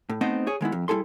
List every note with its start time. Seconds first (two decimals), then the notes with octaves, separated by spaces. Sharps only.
0.09 A2
0.21 A3 B3 C4 D#4 C5 D#5
0.47 G#4 C#5
0.61 D#3 G#3 B3 E4
0.72 F2
0.88 G3 E4 G#4 A4 C6